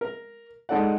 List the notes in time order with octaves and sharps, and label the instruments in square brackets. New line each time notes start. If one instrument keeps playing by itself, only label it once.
[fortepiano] A#4
G#3 D#4 A4 D5 F#5